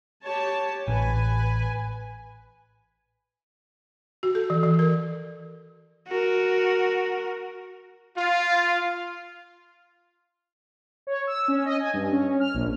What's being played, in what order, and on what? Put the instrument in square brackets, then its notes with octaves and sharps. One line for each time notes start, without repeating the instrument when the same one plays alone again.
[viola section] G4 C#5 A5
[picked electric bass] A1 [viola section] B4 G#5
[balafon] F#4
A4
E3
E3
A#4
[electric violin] F#4 A#4
[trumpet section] F4
[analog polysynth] C#5
E6
C#4
D#5
G#5
G2
C#4
F6
A#1